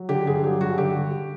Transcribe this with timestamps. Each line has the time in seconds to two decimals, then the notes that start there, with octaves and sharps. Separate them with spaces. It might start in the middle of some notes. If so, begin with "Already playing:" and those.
Already playing: F#3
0.09 D3 G4
0.27 G2 G#4
0.44 F#3 G4
0.61 G2 F#4
0.78 D3 G4